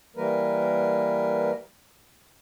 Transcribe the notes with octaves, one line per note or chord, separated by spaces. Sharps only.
E3 G3 A#3 A#4 B4